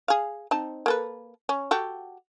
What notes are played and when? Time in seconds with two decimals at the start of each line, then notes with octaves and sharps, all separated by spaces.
0.08 G#4 F5
0.51 C4 D#4 A5
0.86 A#3 A4 B4
1.49 C#4
1.71 F#4 G4 A4